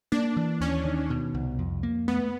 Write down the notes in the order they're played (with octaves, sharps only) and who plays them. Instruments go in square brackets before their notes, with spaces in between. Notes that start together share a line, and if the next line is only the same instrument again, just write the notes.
[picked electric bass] A#3 [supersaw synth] D4
[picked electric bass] E3
[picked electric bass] D#2 [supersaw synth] C#4
[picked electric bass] D#3
B2
C2
F2
A#3
[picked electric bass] A3 [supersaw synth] B3